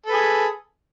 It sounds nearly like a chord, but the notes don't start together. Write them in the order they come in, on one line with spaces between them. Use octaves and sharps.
A4 B4 G#4